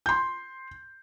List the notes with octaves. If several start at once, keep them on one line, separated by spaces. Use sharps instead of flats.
C6 G6